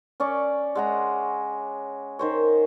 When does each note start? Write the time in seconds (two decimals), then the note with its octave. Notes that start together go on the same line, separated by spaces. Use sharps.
0.20 C#4 D5 C#6
0.75 G#3 F#5 A#5
2.19 D#3 C5 C#5